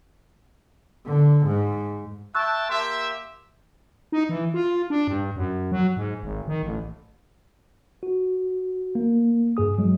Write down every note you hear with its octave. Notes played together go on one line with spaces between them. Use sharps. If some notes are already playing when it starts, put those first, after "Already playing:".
D3
G#2
E5 G5 A5 C#6 E6 F#6
A#3 G4 E5 C6
D#4
E3
F4
D4
G2
F#2
F#3
G#2
G#1
D#3
A1
F#4
A#3
G2 G#4 D#6
F#3 G#3